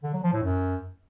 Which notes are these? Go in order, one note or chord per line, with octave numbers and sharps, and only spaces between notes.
D3
F#3
F3
A2
F#2